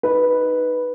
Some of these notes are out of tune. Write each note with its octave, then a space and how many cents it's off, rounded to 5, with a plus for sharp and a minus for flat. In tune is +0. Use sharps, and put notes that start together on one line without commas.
D#4 +0 B4 -5